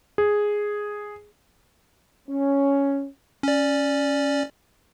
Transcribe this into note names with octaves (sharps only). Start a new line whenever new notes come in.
G#4
C#4
C#4 D5